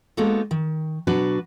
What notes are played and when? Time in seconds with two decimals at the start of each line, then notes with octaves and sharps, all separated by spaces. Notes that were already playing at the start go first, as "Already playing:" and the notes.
0.17 G#3 A#3 B3 D#4 F#4 A4
0.51 D#3
1.07 B2 F#3 D4 F#4 B4